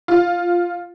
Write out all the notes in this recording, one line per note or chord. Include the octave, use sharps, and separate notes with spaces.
F4